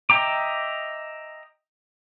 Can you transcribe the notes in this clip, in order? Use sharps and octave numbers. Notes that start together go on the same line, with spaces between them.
D#5 E5 G5 A#5 D6